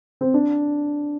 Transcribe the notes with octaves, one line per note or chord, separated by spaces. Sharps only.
C4
D4